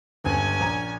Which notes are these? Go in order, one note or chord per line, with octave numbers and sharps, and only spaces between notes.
G1 C#2 C#4 G#5
A#1 A#5